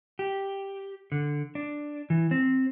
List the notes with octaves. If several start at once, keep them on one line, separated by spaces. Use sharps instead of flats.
G4
D3
D4
E3
C4